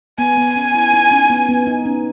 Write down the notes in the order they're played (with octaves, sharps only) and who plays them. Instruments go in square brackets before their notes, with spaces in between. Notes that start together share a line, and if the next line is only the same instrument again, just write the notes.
[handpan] B3 [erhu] G#5
[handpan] B3
C#4
E4
D#4
C#4
B3
B3
D#4
C#4